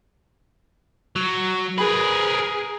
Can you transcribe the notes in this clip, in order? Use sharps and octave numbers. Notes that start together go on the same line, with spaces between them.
F#3
G#4 A#4 B4